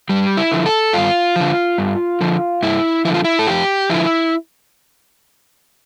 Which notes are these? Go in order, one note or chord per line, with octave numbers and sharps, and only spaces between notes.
G2 G3
E4
D3 F3
A4
G2 F4
D3 F3
G2
D3 F3
G2 E4
D3 F3 E4 F4
E4
A4
F2 G4
D3 F3 E4